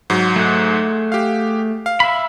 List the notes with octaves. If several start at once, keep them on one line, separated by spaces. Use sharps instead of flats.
G#2 F#3
A3 G#4 F#5
G4 F5
F5
E5 B5